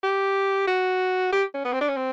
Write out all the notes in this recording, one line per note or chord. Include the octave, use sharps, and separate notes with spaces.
G4
F#4
G4
C#4
B3
C4
D4
C#4
C4